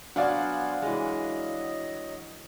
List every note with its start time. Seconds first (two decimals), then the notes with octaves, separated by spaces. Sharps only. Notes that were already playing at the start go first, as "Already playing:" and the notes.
0.16 F#3 B3 D4 C5 D5 F5 F#5 G#5
0.82 E3 F#3 G#3 D#5